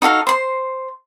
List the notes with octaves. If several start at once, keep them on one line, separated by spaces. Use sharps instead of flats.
D#4 F#4 A4 F5
C5 C6